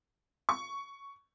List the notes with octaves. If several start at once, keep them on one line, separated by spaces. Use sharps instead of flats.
C#6